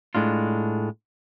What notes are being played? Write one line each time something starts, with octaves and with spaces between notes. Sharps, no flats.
A2 G#3 D4 F4